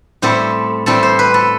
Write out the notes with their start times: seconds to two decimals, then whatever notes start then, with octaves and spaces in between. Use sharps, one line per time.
0.22 A2 G3 C4 A4
0.86 A2 G3 C4 A4
1.03 C5
1.19 B4
1.34 A4